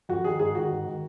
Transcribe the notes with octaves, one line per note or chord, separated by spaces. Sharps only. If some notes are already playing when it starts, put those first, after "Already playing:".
F2 F#4
D#3 G#4
G#2 G#4
D#3 F#4
G#2
D#3